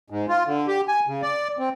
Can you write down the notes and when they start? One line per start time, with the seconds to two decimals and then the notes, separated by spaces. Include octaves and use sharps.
0.10 G#2
0.29 F4
0.46 D3
0.67 G4
0.88 G#5
1.07 C#3
1.22 D5
1.59 C4